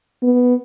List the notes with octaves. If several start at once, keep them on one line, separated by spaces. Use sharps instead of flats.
B3